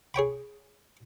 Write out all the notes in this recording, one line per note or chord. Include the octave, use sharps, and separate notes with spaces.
G#4 C#5 G5 B5